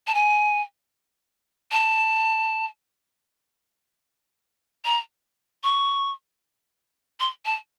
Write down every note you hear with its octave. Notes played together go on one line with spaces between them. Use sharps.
A5
G#5
A5
A#5
C#6
C6
A5